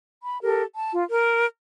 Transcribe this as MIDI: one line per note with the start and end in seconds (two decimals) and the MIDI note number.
0.23 0.41 83
0.42 0.63 67
0.42 0.63 69
0.42 0.63 70
0.76 0.92 81
0.92 1.04 65
1.09 1.44 70